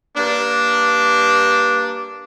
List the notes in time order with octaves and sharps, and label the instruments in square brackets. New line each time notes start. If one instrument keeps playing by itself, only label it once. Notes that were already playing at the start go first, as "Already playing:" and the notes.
[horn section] G2 A#3 D4